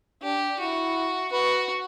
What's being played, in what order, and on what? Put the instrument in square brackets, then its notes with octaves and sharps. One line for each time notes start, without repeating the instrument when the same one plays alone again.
[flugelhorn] D4 [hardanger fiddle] G4
[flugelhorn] E4 [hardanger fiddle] F#4
[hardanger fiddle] F#4 [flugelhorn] B4